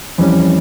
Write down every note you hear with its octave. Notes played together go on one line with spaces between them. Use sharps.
F2 E3 G3 C#4